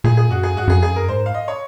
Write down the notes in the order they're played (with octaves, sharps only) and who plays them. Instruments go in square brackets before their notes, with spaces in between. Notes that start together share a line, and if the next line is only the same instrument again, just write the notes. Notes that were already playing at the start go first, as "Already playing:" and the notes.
[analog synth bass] A#2 [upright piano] G#4
[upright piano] G#4
[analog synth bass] F#2 [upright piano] F#4
[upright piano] G#4
[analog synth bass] G#2 [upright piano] F#4
[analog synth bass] F#2 [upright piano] G#4
[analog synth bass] F2 [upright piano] G#4
[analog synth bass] F#2
[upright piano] A#4
[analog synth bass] G#2 [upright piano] C5
[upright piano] F5
D#5
C#5